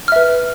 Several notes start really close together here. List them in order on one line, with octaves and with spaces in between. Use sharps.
F6 E5 B4